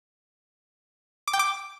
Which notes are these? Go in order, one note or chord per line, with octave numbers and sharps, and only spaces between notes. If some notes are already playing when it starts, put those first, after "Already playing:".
D6
G5
D6